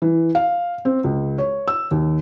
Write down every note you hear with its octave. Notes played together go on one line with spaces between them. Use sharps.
E3
F5
C4
C#2
C#5
E6
D#2